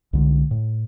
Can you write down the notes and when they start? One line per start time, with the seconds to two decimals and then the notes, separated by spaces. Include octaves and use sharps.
0.13 C2 D3 G#3
0.51 A2